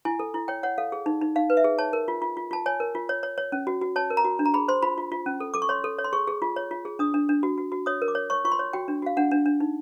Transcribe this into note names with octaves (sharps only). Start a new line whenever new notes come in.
E4 G#5
A4
E4
C#5 G5
C#5 F#5
A4 F5
G#4
D#4
D#4
D#4 F5
B4
E5
G#4
C#5 A5
A#4
F4
F4
F4
F4 A5
C#5 G#5
A#4
F4
C#5
C#5
C#5
C#4
F#4
F#4
C#5 A5
A#4
A#5
F#4
D4
A#5
G#4 B5
C5 C6
F4 B5
F4
F4
C#4
A4
A4 D6
C#6
C#5 C6
A4
C#5
C6
G#4 C#6
G#4
F4
C#5
F4
G#4
D4 D#6
D4
D4
F#4
F#4
F#4
C#5 D#6
A#4
D6
C#5
C#5 C#6
F4 C#6
C6
C#5
F#4 G5
D4
F#4 F5
D4 F#5
D4
D4
D#4